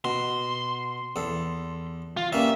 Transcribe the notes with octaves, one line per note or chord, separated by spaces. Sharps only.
B2 C6
E2 A4
F4
G2 A#3 C#4 E5